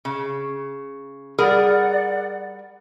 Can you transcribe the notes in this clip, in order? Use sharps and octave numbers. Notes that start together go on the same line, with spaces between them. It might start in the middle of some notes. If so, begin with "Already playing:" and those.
C#3
G3 G#4 A#4 D5 F#5